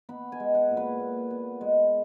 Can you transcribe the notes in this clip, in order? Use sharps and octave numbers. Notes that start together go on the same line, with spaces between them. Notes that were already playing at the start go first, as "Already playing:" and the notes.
B3 B5
G#5
G#3
F#5
A#2
B4
A#2
B3
G#3